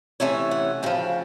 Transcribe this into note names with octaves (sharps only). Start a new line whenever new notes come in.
C3 E3 A3 C#4 C#5
F#5
D2 C#3 F3 G5